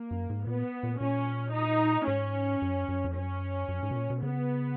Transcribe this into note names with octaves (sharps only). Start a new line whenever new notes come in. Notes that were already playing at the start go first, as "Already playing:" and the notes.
Already playing: A#3
F#2
G#2
A#2 B3
A#2
A#2 C#4
D#4
G#2 C#4
F#2
F#2
F2
F#2 C#4
F#2
G#2
B2
A#2
B2
C#3 B3